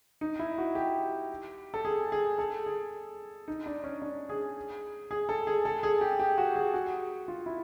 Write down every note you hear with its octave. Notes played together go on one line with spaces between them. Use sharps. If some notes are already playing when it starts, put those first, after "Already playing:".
D#4
E4
F#4
G4
A4
G#4
G#4
A4
G#4
D#4
D4
C#4
D4
G#4
G#4
A4
G#4
A4
G#4
G4
G4
F#4
G#4
F#4
F4
E4